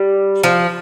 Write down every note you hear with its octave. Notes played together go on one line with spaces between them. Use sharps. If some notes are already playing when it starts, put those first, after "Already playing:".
Already playing: G3
F3